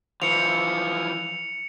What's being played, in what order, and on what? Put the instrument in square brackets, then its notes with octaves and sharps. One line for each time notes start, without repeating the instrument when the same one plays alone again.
[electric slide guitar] E3 F3 [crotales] C#7 F7